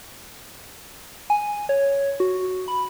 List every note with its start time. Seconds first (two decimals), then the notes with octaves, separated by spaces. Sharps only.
1.30 G#5
1.69 C#5
2.20 F#4
2.68 B5